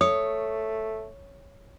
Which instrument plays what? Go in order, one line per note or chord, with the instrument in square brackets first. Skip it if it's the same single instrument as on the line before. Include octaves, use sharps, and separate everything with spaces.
[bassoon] A3 [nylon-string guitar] C#5 [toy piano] D#6